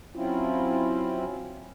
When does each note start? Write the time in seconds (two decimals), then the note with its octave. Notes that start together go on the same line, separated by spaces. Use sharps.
0.16 F#3 C4 C#4 E4 F4